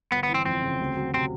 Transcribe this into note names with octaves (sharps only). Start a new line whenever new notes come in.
G1 B3
B3
E3
C4
F2 C4
C#3
D2
F#3
C3 C4